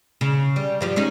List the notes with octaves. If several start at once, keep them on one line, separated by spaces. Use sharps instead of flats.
C#3
G3
G2 F3 G4
G#3 C#4 D#4